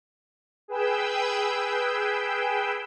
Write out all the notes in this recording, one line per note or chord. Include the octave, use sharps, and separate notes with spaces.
G#4 B4 G5 E6 G6